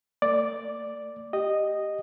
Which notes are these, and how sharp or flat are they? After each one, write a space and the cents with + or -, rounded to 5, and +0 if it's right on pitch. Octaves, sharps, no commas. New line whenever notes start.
A3 +45 D5 +0
G4 +0 D#5 -10